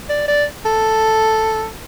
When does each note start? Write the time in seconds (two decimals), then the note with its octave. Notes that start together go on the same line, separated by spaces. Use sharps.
0.09 D5
0.28 D5
0.65 A4